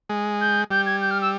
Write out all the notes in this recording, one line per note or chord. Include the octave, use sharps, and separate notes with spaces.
G#3
G6
G3 G6
G#6
G6
F6
E6